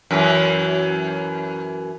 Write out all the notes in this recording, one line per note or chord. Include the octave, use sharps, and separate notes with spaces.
F#2 E3